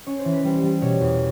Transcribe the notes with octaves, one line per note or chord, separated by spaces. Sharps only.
C#4 C#5
C5
E3
B4
G3 C5
G3
B2 C#5
E2